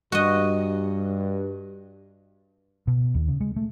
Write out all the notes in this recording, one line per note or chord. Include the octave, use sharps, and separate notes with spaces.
G2 F#4 D#5
B2
D#2
C#3
G#3
A3